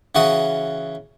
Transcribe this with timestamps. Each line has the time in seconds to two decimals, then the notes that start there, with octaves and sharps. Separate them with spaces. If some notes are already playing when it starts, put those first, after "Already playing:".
0.15 C#3 E3 F#4 F#5 D#6